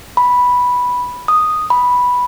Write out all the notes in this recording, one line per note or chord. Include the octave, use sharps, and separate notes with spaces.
B5
D#6
B5